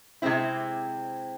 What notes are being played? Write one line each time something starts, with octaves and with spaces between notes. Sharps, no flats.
C3 G#3 C4 E4